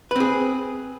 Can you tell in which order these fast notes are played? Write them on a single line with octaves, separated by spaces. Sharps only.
B4 C4 G#4